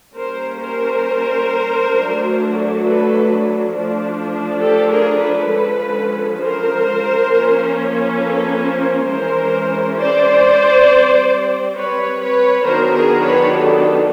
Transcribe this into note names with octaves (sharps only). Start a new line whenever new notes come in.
G3 A#3 C#4 A#4 C5
A#4 C5
F#3 A3 D4
A4 B4
F3 A3 D4
G4 A4
G#4 A#4
A4 B4
D3 F3 G#3 C#4
A#4 C5
F3 A#3 C#4
A4 B4
A#4 C5
E3 G#3 C#4 A#4 C5
C5 D5
G3 C4
B4 C#5
B4 C#5
D#3 F#3 B3 D4 A#4 C5
G#4 A#4
B4 C#5
G4 A4